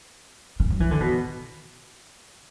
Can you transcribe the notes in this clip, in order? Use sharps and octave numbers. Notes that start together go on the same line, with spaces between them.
C#3
F#3
E3
D3
B2